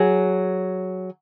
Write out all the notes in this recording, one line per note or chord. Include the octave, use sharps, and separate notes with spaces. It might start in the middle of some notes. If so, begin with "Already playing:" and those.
Already playing: F#3 G#4